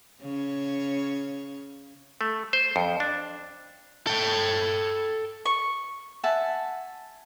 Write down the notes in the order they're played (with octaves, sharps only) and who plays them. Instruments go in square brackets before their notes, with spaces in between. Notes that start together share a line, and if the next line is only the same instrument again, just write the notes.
[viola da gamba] C#3 C#5
[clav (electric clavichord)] A3
C5
F2
D4
[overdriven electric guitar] A4 G5
[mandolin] C#6
[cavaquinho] E5 F#5 G#5 A5